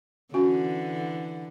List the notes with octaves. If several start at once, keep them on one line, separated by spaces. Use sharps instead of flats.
D3 E3 C#4 F#4